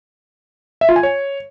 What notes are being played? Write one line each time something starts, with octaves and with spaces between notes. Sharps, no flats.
E5
F4
G#5
C#5